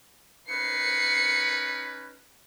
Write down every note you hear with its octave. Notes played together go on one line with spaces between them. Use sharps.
C#4 D#4 B4 C7 C#7